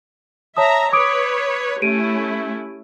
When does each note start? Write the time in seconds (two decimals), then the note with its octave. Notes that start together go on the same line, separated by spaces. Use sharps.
0.57 C#5 E5 A5 A#5 D#6
0.93 B4 C#5 D6 D#6 D7
1.82 A3 C#4 E4 G4 D7 D#7